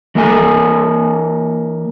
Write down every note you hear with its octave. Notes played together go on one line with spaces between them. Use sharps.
E3 A#3 A#4 E5 G#5